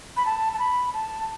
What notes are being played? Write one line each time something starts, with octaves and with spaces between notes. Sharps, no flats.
B5
A5
A5
B5
A5